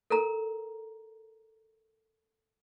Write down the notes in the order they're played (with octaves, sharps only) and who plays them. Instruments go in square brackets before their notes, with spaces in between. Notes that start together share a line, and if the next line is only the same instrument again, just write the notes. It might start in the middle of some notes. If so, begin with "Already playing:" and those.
[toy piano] A4 A#4 A#5